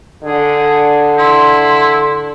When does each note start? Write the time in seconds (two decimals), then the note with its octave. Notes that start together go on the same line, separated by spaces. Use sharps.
0.23 D3 G#4
1.18 E4 C6